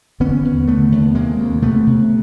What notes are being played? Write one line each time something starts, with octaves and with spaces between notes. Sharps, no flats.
D3 B3 C#4
D#2
D3 A3 B3
D#2
C3 G#3 A#3
D2
C3 A3 B3
C3